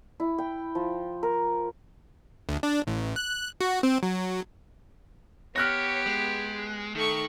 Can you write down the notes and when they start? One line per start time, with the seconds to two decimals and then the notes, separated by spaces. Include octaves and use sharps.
0.20 E4
0.38 G5
0.75 F3
1.23 A#4
2.49 D2
2.63 D4
2.87 A1
3.16 F#6
3.61 F#4
3.83 C4
4.03 F#3
5.56 B3 G4 C#5 F6 F#6 A#6
6.06 G#3
6.95 D#3 A3 C#6